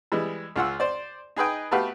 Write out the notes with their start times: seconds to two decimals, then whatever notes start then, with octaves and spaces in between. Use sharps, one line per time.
0.12 E3 G3 G#3
0.56 C#2 F4 F#5 E6
0.80 C5 D5
1.36 D#4 G#4 B4 D#5 G5
1.71 A3 B3 F#4 G4 B4 F5